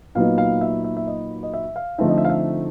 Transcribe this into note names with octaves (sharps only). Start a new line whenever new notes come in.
A#2 F#3 B3 D#4 F5
F5
E5
E5
E5
D#5
D#5
E5
F5
D3 F3 A3 C4 D#4 E5
D#5
E5
F5
E5